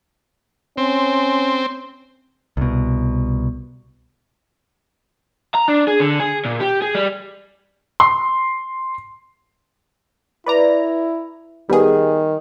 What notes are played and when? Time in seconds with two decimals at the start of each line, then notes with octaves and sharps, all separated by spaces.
0.77 C4 C#4
2.57 C2 B2
5.55 A#5
5.68 D4
5.88 G#4
6.00 D3
6.20 G#4
6.45 A#2
6.60 G4
6.82 G#4
6.95 G3
8.00 C6
10.46 E4 B4 D5 A#5
11.70 D#3 G3 B3 G#4